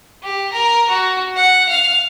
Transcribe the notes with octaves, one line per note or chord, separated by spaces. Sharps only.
G4
A#4
F#4
F#5
F5